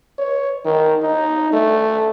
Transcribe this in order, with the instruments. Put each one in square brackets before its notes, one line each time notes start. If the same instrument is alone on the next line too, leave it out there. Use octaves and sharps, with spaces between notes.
[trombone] C#5
D#3
D#4
A3